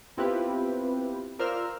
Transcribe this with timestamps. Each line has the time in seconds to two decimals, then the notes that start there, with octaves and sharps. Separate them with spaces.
0.17 B3 C4 E4 F4 G4 B4
1.39 F4 A#4 C5 D5 E6 F6